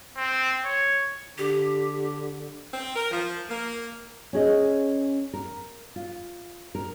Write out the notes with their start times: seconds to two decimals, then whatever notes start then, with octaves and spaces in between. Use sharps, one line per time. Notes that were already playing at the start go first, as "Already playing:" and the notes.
0.17 C4
0.65 C#5
1.38 D3 G4
2.74 C4
2.96 A#4
3.12 F3
3.49 A#3
4.33 C#4 G#4 D#5
5.33 A#4
5.96 F4
6.75 A#4